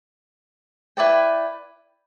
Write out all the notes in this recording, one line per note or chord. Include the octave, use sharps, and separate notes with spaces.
E4 B4 D5 G5